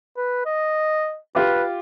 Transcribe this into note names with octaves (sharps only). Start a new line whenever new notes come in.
B4
D#5
F4 G4 B4